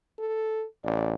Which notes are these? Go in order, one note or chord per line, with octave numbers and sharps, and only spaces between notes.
A4
A1 D5